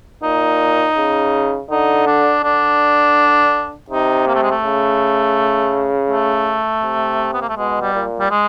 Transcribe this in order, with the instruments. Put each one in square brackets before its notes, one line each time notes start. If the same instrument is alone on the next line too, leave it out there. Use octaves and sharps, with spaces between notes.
[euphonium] A#2 [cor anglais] D#4
[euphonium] C#3
[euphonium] D3 [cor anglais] D#4
[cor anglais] D4
[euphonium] D3 [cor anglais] D4
[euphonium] C3 [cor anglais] D#4
[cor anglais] A#3
A3
G#3
A3
[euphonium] C#3
[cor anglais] A3
[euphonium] C3
[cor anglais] B3
A#3
A3
[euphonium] B2 [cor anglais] G#3
[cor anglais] G3
[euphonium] A#2
[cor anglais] G3
G#3